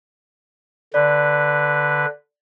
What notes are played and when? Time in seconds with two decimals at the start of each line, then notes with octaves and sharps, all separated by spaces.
0.94 D3 B4 D5